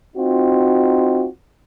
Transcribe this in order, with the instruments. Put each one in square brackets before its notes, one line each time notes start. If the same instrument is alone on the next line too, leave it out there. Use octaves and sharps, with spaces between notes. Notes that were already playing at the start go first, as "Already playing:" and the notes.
[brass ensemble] C4 D#4 F4 F#4